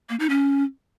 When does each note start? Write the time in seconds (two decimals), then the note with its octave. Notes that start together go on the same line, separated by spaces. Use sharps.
0.09 A#3
0.20 D#4
0.30 C#4